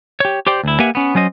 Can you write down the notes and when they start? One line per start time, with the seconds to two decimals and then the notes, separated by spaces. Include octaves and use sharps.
0.20 G4 C#5
0.47 G4 C5 D5 G5
0.64 D2 E4
0.80 A#3 G4 B4 E5 F#5 G#5
0.95 B3 C#4
1.15 F#3 C#4 C5 D#5